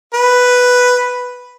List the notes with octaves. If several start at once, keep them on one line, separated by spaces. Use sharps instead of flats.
B4